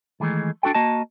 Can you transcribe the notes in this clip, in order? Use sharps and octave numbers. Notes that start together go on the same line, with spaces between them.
D#3 E3 G#3 A3
D4 F#4 A4 G5
A#3 F#4 D#5 A5